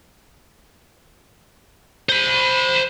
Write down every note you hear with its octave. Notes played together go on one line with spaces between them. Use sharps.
C5 B5